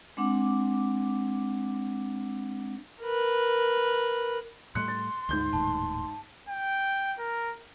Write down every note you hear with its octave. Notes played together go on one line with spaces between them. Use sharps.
G#3 C4 D4 F#5 D6
A#4 B4
A2 G3 A3 C6 F#6 C#7
A6
D2 G#2 G6 G7
D#1 D#2 A2 A5
G5
A#4